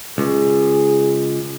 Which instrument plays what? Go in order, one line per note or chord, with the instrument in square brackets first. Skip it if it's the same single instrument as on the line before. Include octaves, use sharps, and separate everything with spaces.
[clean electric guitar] C#2 [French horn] G#4